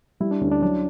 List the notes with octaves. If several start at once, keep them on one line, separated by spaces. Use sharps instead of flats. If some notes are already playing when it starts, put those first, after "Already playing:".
G3 E4
D4
D2 C#4
D4
F#3 D4